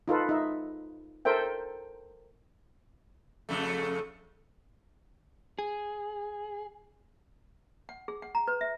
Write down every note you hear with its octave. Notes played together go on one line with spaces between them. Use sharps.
D#4 F4 A4 B4
D#4 E5
A4 A#4 C5 E5 G5
F2 C#3 A3
G#4
F#5
G#4
F#5
A#5
B4
E5